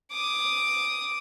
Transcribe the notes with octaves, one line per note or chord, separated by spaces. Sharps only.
D6 D#6